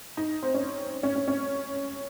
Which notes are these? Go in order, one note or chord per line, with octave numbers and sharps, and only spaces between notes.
D#4
C4
C#4
C#4
C#4
C#4